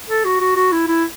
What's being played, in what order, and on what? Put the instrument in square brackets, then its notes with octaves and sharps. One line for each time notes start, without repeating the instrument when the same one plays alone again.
[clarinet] A4
F#4
F#4
F#4
E4
E4